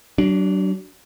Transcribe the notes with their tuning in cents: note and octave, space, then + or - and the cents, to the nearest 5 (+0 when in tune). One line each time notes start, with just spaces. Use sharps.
F#3 +40 D4 +0